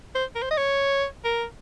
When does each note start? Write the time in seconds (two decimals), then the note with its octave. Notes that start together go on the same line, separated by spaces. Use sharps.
0.15 C5
0.35 A#4
0.42 C5
0.51 D#5
0.57 C#5
1.25 A#4